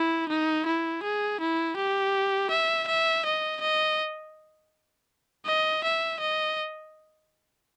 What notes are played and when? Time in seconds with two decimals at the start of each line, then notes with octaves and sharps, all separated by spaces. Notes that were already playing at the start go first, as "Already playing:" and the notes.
Already playing: E4
0.28 D#4
0.66 E4
1.04 G#4
1.40 E4
1.77 G4
2.50 E5
2.88 E5
3.25 D#5
3.61 D#5
5.46 D#5
5.84 E5
6.20 D#5